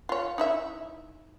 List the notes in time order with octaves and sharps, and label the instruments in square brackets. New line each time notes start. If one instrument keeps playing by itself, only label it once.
[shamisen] F4 C#5
D#4 E4 E5